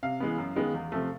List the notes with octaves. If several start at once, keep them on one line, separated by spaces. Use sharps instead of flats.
C3 F5
E3 G#3 B3
F#2
D#3 G#3 B3
E2
C3 F3 A3